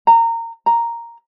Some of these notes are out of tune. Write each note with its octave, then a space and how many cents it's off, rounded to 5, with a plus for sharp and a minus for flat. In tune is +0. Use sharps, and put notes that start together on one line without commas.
A#5 -20
A#5 +0